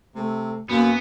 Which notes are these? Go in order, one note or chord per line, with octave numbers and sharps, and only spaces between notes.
C3 A3
F#2 A#3 B3 F#4